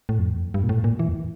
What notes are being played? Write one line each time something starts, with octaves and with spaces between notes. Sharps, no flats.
A2
F2
E2
F2
G2
A#2
A2
A#2
E3
E2